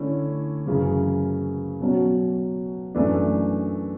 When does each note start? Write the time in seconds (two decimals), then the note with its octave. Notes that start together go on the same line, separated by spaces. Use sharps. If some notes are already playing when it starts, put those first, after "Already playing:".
Already playing: D3 A3 C#4 E4
0.66 F#2 C#3 E3
1.81 B2 F#3 C#4
2.95 F#2 E3 A3 D4